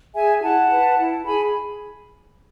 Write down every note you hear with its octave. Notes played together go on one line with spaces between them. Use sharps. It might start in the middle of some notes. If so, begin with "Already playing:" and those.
G#4 E5 G#5
E4 F#5 A5
B4
E4
G#4 G#5 B5